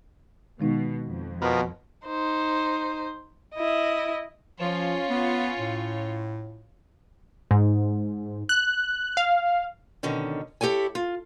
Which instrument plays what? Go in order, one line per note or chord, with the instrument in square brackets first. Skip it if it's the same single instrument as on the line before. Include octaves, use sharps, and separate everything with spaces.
[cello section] B2 [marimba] D#3 G#3 D#4
[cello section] F2
[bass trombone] B2 [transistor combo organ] F3 A#4 B4
[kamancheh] D#4 C5
E4 D#5
[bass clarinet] F3 [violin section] C#4 F4 C#5
[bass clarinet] B3
A2
[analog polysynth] G#2
F#6
F5
[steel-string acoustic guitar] B2 D3 D#3 C#4
E4 G4 A4 C#5 G#5
F4